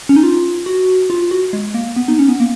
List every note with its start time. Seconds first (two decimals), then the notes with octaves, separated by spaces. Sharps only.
0.09 C#4
0.16 D#4
0.23 F4
0.66 F#4
1.10 F4
1.31 F#4
1.53 G#3
1.74 A#3
1.96 B3
2.08 D#4
2.19 C#4
2.29 B3
2.40 A#3